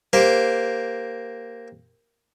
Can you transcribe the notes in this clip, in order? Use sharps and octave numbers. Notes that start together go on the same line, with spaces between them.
A#3 G4 C5